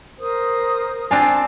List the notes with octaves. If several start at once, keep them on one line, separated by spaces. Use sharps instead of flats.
A#4 C5 D#6
C4 D4 F4 G#5